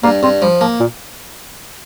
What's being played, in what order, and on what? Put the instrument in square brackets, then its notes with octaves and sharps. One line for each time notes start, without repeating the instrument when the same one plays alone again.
[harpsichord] G2 [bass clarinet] A#3
[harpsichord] G2 [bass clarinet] C4
[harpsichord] F3 [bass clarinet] G3
[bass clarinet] F3 [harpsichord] A#3
[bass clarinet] A#2